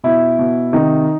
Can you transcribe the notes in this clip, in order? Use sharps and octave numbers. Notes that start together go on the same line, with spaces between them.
B2 E4
B2
C3 D#3 D#4